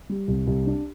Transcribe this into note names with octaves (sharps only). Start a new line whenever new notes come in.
G3
C2
C2
D4